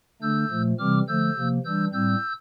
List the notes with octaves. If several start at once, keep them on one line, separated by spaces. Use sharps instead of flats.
D3 A3 D4 E6 G6
A#2 F3 A3
C3 E3 G3 C4 D6 F6
D3 F3 A3 E6 G6
C3 F3 A#3
E3 G3 D4 E6 G6
A2 G3 C4 E6 G6